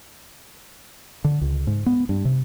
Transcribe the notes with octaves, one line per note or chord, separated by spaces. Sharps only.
D3
C#2
G#2
B3
G2
C3